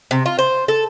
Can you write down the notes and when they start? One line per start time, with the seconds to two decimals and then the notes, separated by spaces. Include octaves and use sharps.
0.11 C3
0.26 F4
0.39 C5
0.68 A4